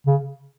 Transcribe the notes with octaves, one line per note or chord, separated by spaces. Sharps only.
C#3